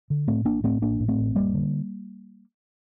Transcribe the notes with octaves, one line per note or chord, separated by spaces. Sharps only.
D3
A2 A3 C4
A1 A#3 D4
A2 A3 C4
A1 A#3 D4
A2
A3 C4
A1
F1 G3 A#3
D3